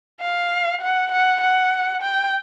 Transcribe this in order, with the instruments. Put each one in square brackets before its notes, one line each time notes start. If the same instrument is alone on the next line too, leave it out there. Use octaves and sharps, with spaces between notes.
[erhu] F5
F#5
F#5
F#5
G5